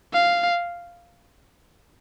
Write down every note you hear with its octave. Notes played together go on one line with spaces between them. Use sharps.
F5